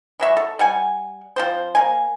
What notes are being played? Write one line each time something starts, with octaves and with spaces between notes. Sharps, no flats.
E3 F#3 E5 C#6
A4
G3 F#5 G#5
F3 C4 C5
A#3 G#5